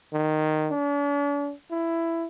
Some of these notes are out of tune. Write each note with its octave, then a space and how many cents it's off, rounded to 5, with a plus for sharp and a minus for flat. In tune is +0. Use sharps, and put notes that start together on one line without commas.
D#3 -10
D4 -45
E4 +15